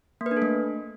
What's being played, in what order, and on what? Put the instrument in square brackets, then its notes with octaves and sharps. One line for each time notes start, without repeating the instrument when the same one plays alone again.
[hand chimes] A#3
B4
D4
A4
A3